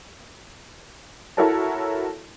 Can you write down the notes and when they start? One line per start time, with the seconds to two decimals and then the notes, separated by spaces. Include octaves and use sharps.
1.37 E4 F#4 A4 A#4 C#5 A5